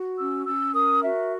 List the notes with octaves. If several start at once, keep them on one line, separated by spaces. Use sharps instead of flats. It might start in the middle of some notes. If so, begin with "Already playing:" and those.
Already playing: F#4
C#4 E6
C#4 E6
A#4 D#6
F#4 E5